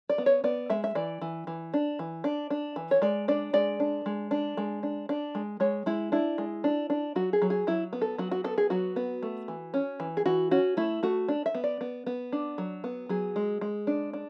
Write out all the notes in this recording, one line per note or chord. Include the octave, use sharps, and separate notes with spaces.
D5
B3
C#5
B3 D5
G#3 E5
E5
E3 D5
E3
E3
D4
E3
D4
D4
E3
C#5
G#3 D5
D4 D5
G#3 D5
D4
G#3
D4
G#3
D4
D4
G#3
G#3 C#5
G#3 E4
D4 E4
G#3
D4
D4
F#3 F#4
G#4
F#3
G#4
F#3 E4
B3
A4
F#3 F#4
F#4
B3 A4
G#4
F#3 F#4
B3
A3
E3
C#4
E3
G#4
E3 F#4
C#4 F#4
A3 E4
A3 F#4
D4
E5
B3
D5
B3
B3
D4
F#3
B3
F#3 G#4
G#3
G#3
D4
D4